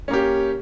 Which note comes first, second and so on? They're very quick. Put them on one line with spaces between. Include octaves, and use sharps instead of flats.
C#4 A#3 G4